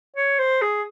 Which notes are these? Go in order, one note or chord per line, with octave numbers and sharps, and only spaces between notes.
C#5
C5
G#4